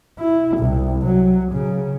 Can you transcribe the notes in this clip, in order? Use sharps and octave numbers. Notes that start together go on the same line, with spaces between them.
E4
C2
F#3
C#3